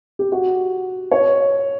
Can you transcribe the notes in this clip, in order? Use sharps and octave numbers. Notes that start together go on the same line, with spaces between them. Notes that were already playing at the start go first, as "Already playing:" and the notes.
G4
F#4
C#5